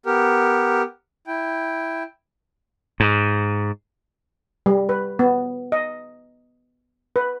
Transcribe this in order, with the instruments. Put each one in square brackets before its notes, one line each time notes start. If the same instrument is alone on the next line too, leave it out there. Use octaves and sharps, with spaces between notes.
[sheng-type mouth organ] B3 G4 A#4
E4 G5
[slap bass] G#2
[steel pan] G3
B4
B3
D#5
B4